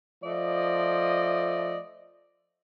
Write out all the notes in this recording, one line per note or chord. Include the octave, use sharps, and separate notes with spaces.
F3 A3 D5 D#5